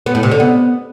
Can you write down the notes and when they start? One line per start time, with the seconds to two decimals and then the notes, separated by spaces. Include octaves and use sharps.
0.06 B3
0.15 A2
0.23 C3
0.31 D3
0.40 B3